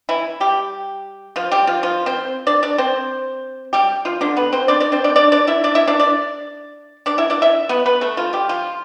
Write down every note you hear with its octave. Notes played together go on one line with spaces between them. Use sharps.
E3 E4
G3 G4
F3 F4
G3 G4
F3 F4
F3 F4
C4 C5
D4 D5
D4 D5
C4 C5
G3 G4
F3 F4
D3 D4
B3 B4
C4 C5
D4 D5
D4 D5
C4 C5
D4 D5
D4 D5
D4 D5
E4 E5
D4 D5
E4 E5
D4 D5
D4 D5
D4 D5
E4 E5
D4 D5
E4 E5
B3 B4
B3 B4
A3 A4
F3 F4
G3 G4
F3 F4